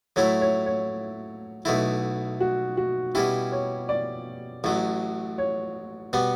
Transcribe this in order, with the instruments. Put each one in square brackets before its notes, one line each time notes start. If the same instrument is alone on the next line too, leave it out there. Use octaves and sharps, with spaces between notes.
[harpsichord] A2 F#3 A3 E4 [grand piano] C#5
[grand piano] C#5
C#5
[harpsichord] B1 B2 A3 E4
[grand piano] F#4
F#4
[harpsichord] B2 G3 C#4 E4 [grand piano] G4
[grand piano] C#5
D5
[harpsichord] A1 A2 F#3
[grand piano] C#5
[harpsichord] B2 G3 B3